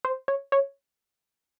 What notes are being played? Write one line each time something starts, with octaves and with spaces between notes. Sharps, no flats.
C5
C#5
C#5